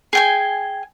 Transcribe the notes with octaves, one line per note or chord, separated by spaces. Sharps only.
G#4 G5 G#5